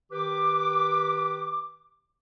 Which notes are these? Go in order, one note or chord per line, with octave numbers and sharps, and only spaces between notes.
D#3 G4 B4 D6